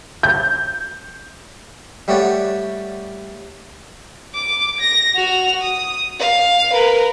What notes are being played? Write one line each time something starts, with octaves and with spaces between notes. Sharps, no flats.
G6
G3 A3 C#5 D5 F#5
D6
A#6
F#4 F7
D#6
F5
A#4 B4